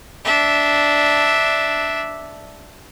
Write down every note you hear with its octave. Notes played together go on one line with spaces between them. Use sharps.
D4 E5